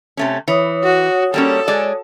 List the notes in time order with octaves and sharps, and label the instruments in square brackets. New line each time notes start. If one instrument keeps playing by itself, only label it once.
[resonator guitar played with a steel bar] C3 A3 C#4
[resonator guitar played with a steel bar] E3 [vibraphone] C#5 D#6
[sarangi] F#4
[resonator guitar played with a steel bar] G3 A#3 C#4 [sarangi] A4
[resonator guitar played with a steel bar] G#3 G#4 D5